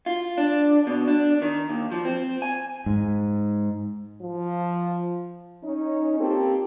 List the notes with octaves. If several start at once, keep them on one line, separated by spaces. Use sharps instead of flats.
F4
D4
B2
D4
D#3
D#2
F3
C4
G#5
G#2
F3
C#4 D#4
A#3 C4 F4 G4 A4